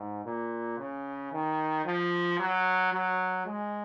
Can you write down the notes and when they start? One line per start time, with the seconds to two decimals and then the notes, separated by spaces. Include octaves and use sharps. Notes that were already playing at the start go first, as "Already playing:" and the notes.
Already playing: G#2
0.25 A#2
0.79 C#3
1.33 D#3
1.85 F3
2.40 F#3
2.93 F#3
3.46 G#3